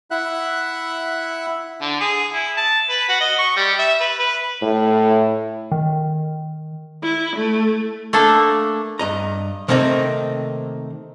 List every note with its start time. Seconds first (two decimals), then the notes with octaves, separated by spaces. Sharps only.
0.11 E4 E5 F#5 F#6
1.81 D3
2.00 G#4
2.33 E4
2.57 A5
2.89 B4
3.09 F#4
3.21 D#5
3.39 C#6
3.57 G3
3.79 E5
4.00 B4
4.19 B4
4.62 A2
5.72 D#3
7.02 E4
7.36 A3
8.13 A3 A#3 D4 A4
8.99 G2 D#5 A#5
9.68 C3 D#3 A3 A#3 C4 D#4